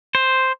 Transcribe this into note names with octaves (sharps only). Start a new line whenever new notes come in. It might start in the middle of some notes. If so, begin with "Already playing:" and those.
C5